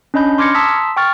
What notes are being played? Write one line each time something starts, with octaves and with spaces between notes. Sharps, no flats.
C#4 D4 D#5 B5 G6
C6 D6 F6 G#6 A#6 C#7
A5 A#5 C6 D#6 E6 B6
G5 C#6 F6 A6